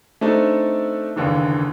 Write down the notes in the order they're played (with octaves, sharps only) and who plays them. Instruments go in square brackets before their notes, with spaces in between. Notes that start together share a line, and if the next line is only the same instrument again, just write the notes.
[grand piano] A3 C4 D4 D#4 A4
F#1 D#2 D3 E3